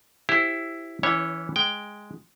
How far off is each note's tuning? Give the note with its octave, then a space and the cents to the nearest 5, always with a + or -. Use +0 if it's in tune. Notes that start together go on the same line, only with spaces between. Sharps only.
E4 +5 G4 +0 C5 +0
E3 +0 C#4 +20 C#5 -15
G#3 +0 G5 +0